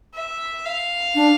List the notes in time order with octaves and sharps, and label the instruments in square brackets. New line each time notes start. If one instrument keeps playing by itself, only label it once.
[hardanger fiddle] E5
F5
[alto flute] D4